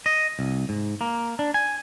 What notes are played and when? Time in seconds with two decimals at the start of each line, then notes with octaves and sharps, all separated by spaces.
0.06 D#5
0.39 C2
0.69 G#2
1.01 A#3
1.39 D4
1.54 G#5